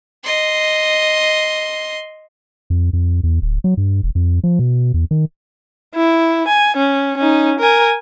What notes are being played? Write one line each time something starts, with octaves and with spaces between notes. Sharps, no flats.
D#5 C6
F2
F2
E2
D1
F#3
G2
E1
F2
F3
B2
E2
D#3
E4
G#5
C#4
C#4 D#4
A#4 G#5